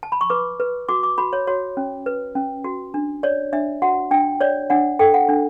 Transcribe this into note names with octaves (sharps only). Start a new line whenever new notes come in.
A5
B5
C#6
B4 D6
B4
F#4 D6
D6
F#4 B5
C#5
F#4 C#5
C#4
B4
C#4
F#4
D4
C#5 D5
D4 E5
F#4 F#5
D4 G5
C#5 D5
D4 F#5
A4 G5
F#5
D4